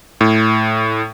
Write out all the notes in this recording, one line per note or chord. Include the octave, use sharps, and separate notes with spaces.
A2